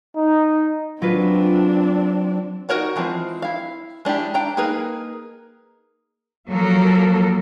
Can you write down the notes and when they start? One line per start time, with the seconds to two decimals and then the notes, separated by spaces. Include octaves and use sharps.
0.16 D#4
1.02 F#3 C4 D4 F4 B4
2.69 D#4 F#4 A#4 C#5 F#5
2.96 E3 F3 G#3 C4
3.42 E4 F5
4.05 G#3 D4 E4 G4
4.34 D4 G5 A#5
4.57 A#3 D#4 G#4 A#4 B4
6.48 F3 F#3 A#3 A4 A#4